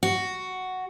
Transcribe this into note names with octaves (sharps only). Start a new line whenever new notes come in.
F#4